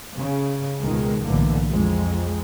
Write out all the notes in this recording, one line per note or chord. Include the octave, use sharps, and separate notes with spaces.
C#3
C#2 B2 D#3 G#3
B1 A2 D3 E3 A#3
F2 G#3